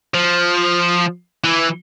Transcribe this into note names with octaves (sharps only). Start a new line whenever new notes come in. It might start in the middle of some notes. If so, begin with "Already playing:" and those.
F3
E3